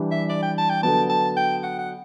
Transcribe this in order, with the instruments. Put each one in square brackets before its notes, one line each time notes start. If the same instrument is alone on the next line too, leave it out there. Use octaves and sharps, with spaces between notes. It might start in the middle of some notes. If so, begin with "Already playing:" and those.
Already playing: [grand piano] E3 G3 D4 G4
[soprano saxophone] E5
D5
G5
A5
G5
[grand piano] D3 F#3 B3 [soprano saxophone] A5
[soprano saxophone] A5
G5
F#5
F#5